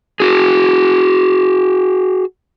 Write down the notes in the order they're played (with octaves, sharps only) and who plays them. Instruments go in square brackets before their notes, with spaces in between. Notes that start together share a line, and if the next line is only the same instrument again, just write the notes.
[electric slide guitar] F#4 G#4